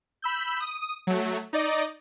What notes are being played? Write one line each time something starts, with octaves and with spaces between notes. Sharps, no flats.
B5 E6 G6
D#6
F#3 A3
D#4 D5 D#5